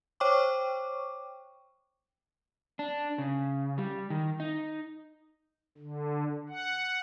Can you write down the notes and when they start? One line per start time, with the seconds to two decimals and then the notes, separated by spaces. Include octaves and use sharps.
0.20 C5 C#5 G5 C#6 D6
2.79 D4
3.18 C#3
3.78 G3
4.10 D#3
4.40 D#4
5.78 D3
6.49 F#5